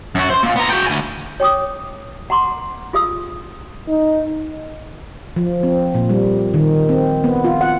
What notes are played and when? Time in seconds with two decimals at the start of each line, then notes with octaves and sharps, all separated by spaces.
0.15 F#2 F#4
0.30 C5 C6
0.43 A#2
0.56 B3 A#5
0.70 F#4 G5
0.87 D2 G#5
1.40 C#5 G5 D6 D#6
2.30 F#5 A#5 C6 D6
2.93 F4 G#4 F5 D#6 E6
3.88 D#4
5.36 F3
5.63 C4
5.94 A#2
6.09 G3
6.54 D#3
6.89 C4
7.24 B3
7.44 F4
7.61 F#5